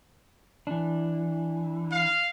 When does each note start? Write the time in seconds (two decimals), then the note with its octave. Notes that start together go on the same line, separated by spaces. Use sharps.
0.67 E3 D4
1.92 F5